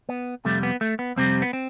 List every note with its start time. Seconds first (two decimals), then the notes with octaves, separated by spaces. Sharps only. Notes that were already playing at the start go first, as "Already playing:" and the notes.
0.09 B3
0.45 F2 C3 G3 A3
0.63 B3
0.81 A3
0.99 B3
1.16 F2 C3 G3 C4
1.42 B3
1.53 C4